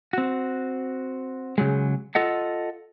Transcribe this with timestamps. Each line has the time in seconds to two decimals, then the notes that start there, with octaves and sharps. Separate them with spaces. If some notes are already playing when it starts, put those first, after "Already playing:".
0.13 C4 F#4
1.58 C#3 F#3 G#3
2.15 F4 A4 D#5 F#5